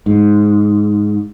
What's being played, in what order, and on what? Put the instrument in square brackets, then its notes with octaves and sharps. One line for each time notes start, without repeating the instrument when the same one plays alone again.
[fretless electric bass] G#2